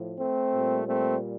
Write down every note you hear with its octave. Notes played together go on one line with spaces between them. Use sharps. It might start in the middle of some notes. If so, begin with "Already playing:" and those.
Already playing: A2 F3
A3 C4
A#2 G3
A3 C4